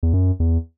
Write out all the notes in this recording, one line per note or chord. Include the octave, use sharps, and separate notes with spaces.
E2
F#2
E2